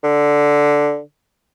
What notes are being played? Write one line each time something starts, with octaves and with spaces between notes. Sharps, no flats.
D3